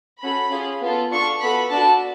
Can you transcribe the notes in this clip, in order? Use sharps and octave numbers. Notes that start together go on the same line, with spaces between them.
C#4 F#4 A4 B5
C#4 F4 G#4
B3 F4 A4
D4 F4 A4 C#6
B3 F#4 A4 B5
D4 F#4 A4 A5